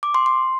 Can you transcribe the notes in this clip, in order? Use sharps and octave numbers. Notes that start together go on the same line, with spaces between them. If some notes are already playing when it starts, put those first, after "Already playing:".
D6
C6
C6